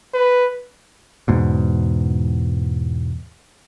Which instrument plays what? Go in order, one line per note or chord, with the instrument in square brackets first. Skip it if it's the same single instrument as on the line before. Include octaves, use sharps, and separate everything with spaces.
[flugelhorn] B4
[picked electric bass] E2 G#2 B2